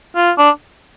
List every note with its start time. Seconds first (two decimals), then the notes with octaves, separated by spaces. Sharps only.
0.15 F4
0.38 D4